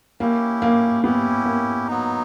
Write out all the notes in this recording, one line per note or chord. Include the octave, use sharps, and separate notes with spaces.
A#3 C#4 E4 G4
A#3
B3 C#4 E4 G4
A#3
F#3 B3 D#4